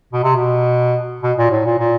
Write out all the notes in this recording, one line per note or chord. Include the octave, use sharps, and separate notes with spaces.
B2
C3
B2
B2
A#2
A2
A#2
A#2